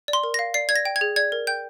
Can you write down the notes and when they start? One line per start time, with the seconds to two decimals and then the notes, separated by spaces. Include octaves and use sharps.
0.08 D5
0.13 C6
0.23 A#4
0.34 A#6
0.39 F5
0.54 D5 C7
0.69 D5 G#6
0.76 A#6
0.85 G5
0.96 G#6
1.01 G#4
1.16 D5 G#6
1.32 A#4
1.47 G5 G6